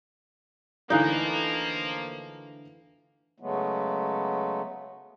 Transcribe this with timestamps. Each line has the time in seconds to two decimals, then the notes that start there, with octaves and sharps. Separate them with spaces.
0.90 D2 E3 F3 A#3 D#4 F5 F#6
3.40 C#3 F#3 G#3 A3 B3